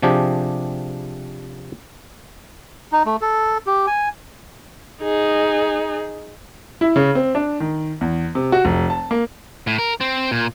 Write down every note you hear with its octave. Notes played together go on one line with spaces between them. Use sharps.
C3 F3 D4 G4 G#4
D#4
A3
A4
G4
G#5
D#4 G#4
E4
C#3
C4
D4
D#3
E2
C3
F#4
F1
A5
A#3
A2
A#4
C4
A#2